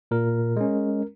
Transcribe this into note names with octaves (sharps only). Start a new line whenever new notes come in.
A#2 A#4
G#3 C#4